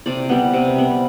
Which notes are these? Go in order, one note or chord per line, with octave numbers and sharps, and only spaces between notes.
C3 D5
G3 B3
C3
G3 B3